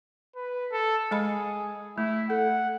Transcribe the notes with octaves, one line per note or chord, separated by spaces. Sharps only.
B4
A4
G#3 G#4 D#5 B5
A3 E4
A4 F#5